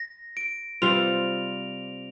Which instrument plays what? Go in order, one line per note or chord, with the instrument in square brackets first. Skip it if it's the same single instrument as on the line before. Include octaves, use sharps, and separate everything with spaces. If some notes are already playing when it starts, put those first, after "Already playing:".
Already playing: [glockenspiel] A#6
D7
[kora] C3 G3 C4 F4 [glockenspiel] F7